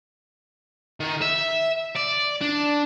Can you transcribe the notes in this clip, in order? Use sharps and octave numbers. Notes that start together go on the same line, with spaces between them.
D#3
E5
D5
D4